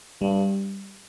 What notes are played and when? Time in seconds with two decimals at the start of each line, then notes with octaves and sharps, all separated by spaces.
0.21 G2 G3